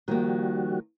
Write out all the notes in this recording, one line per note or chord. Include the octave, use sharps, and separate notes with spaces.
D#3 F3 G3 A#3 F#4